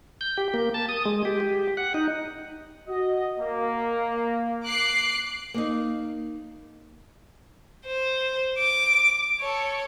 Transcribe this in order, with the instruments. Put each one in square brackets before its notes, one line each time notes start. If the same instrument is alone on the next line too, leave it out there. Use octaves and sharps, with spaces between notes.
[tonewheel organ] G6
G4
A#3
A5
D#6
G#3
G4
G4
F#5
D#4
[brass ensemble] F#4 D#5
A#3
[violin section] D6 F#6 C7
[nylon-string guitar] A#3 D#4
[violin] C5
D6
A4 C#5